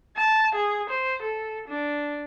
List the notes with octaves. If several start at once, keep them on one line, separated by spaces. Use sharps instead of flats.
A5
G#4
C5
A4
D4